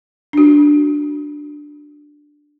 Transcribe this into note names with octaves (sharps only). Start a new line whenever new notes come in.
D4 F#4